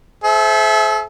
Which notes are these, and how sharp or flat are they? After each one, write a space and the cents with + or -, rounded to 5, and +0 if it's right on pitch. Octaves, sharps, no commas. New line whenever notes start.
A4 -45 C5 +0 E5 +0